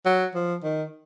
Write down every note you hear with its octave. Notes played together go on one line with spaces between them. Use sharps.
F#3
F3
D#3